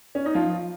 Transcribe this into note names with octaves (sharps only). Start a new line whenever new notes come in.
C#4
D#4
F3 F4